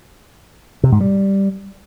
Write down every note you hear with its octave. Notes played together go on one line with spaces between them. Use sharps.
C3
G#2
G3